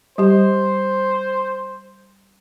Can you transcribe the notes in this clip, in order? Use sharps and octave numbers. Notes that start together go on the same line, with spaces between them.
G3 G4 C5